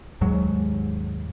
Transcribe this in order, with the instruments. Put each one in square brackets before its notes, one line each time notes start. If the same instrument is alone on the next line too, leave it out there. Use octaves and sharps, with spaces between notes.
[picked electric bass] D#2 G#2 F#3 G#3